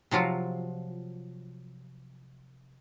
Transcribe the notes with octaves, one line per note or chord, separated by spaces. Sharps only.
C3 F3 F#3 F4